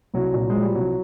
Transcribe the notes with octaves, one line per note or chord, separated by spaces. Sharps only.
C2 F#3
A#2
G#3
F3
G3
C2 F#3